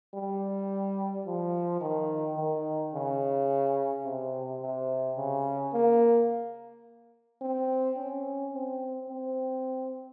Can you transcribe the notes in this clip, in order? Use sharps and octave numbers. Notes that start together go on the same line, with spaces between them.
G3
F3
D#3
D#3
C#3
C3
C3
C#3
A#3
C4
C#4
C4
C4